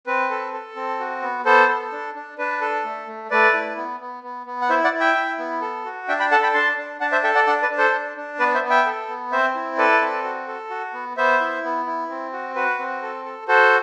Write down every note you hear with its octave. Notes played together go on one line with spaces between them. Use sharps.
C4 B4
A4
A4
C4
F#4
B3
B3 A4 C5
A4
D4
D4
D4 B4
A4
A3
A3
A3 B4 D5
E4
B3
B3
B3
B3
F#5
E4 C5 E5
D5 F#5
E4
E5 G5
E4
B3
A4
F#4
D4 E5 G5
G5 B5
A4 F#5 A5
G5 B5
D4 A5 C6
D4
D4 F#5 A5
C5 E5
A4 E5 G5
D5 F#5
D4 D5 F#5
B4 D5
D4
A4 C5
D4
D4
B3 B4 D5
C5 E5
B3
E5 G5
A4
B3
C4 C5 E5
E4
A4 B4 D5
C4
F#4
A4
F#4
B3
B3 C5 E5
E4
B3
E4
C4
F#4
F#4 B4
C4
A4
A4
F#4 A4 C5